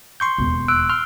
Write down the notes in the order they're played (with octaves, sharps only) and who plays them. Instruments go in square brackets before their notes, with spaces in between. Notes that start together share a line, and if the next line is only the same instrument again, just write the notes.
[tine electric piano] C6 C#6 G6
[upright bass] E1 D#2
[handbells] E6 F#6 D7
[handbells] C6 [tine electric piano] F6